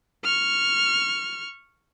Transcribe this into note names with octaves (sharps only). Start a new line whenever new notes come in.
C#6 F6